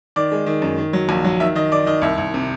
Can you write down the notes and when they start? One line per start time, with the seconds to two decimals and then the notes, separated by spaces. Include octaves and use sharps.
0.16 D#3 D5
0.32 G#3
0.46 D#3
0.62 F#2
0.78 D#3
0.93 F#3
1.09 A#1
1.24 F#3
1.40 D#3 E5
1.55 D#3 D#5
1.71 D#3 D5
1.86 D#3 D#5
2.02 C2 E5
2.18 C2
2.34 C3